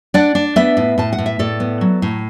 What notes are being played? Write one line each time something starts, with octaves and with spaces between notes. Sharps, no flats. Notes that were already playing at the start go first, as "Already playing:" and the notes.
D4 D5 F#5
D4
B3 B4 E5
A2
A2 A5
F#5
A2
E5
A2 A4 D5
B3
F#3
A2